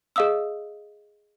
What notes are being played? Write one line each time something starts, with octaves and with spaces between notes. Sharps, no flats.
G#4 D#5 F5 D#6 E6